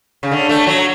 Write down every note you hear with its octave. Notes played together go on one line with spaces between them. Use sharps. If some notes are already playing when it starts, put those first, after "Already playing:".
C#3
D3
A3
F#3